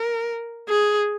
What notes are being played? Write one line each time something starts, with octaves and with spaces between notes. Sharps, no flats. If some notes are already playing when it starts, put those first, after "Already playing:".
Already playing: A#4
G#4